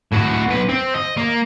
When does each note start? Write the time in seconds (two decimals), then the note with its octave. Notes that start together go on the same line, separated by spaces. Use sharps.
0.12 A2 F#4
0.48 B1 B4
0.69 C4
0.94 D#5
1.17 A#3